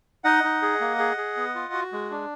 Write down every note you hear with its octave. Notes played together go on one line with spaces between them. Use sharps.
D#4 D#5 F#5
D#4
G#4
A#3
G#4
G#4
B3
F4
F#4
G#3
D4